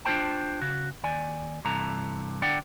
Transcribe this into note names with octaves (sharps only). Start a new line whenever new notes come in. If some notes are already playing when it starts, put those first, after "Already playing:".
D4 F4 A4 C5 G5 A5
C#3 F#4
D#2 D5 G#5
G2 C3 E3 A4 A#5
D3 D4 D5 F#5 G5